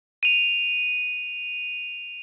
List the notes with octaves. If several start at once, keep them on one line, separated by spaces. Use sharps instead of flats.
D#7 F7